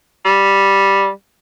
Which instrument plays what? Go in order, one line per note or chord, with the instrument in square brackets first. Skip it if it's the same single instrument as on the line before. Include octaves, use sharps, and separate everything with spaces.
[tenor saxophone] G3